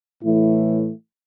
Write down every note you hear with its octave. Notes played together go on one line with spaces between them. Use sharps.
A2 E3 A3 E4